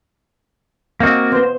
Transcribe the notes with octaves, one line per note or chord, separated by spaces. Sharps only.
A#3 C4 F#4 D#5 F5
B3 C5